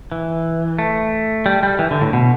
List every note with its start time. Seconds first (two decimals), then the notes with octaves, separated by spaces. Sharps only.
0.12 E3
0.79 A3
1.46 G3
1.63 G3
1.79 E3
1.91 D3
2.02 A2
2.13 B2